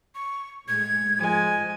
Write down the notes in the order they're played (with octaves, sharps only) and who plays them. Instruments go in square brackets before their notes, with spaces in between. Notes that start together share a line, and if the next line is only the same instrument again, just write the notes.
[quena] C#6
[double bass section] A2 G#3 [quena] G#6
[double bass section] G#2 F3 [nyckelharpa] G#3 G#5